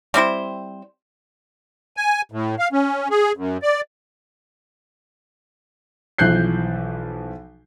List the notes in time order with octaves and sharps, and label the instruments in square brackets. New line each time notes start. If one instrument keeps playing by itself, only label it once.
[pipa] G3 C4 E4 C5
[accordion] G#5
A2
F5
C#4
G#4
F#2
D5
[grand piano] B1 E3 F3 F#6 G6 C7